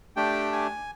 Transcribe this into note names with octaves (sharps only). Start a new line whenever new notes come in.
A3 D4 G4 G5
G#5